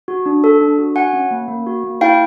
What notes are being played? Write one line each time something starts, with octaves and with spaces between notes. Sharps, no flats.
F#4
D4
A4
D4
F#4
F#4 F#5 G#5
C#4
A#3
A#3
F#4
A#3
E4 F5 G5